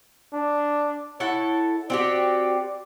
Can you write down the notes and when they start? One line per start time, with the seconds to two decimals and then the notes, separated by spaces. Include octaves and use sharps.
0.33 D4
1.20 E4 A4 C#5 F#5
1.90 C4 F#4 G4 D5